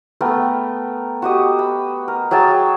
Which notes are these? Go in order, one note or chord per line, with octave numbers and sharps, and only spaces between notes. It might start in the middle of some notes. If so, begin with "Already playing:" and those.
A3 B3 A#4 G5
F#4 G4 D#5
B5
A#4
F#3 G#4 G5 A5